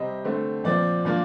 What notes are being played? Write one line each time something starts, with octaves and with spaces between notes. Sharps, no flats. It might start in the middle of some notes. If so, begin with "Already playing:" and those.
Already playing: C3 G3 C4 D#5
D3 A3 C4
A#2 F3 C4 D5
A#2 F3 A#3 D4